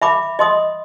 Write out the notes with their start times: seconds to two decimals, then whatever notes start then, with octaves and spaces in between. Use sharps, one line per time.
0.02 E5 B5 D6
0.39 D#5 C6 D#6